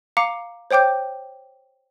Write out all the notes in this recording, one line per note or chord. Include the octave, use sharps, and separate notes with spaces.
F5 A#5 D6 C#7
C5 C#5 G5 D6 G6